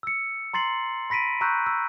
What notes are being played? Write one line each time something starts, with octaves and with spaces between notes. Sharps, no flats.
E6 C#7
A#5 C6 A6 C7 F#7
B5 A#6 B6 D7 D#7
A#5 C#6 E6 F#6 G6 B6
E6